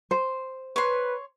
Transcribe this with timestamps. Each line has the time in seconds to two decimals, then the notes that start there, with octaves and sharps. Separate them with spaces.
0.11 C5
0.76 B4 C#5 C6